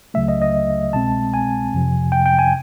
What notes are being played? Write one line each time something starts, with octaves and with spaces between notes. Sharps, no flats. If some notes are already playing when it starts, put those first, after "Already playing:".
C#2 C#3 F#3 A3 E5
D#5
D#5
C2 B2 G#3 C4 A5
G#5
F2 C3 F3
G5
G5
G#5